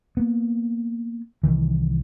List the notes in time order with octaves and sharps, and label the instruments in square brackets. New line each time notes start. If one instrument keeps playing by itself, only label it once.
[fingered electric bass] A#3 B3
C2 C3 D#3 E3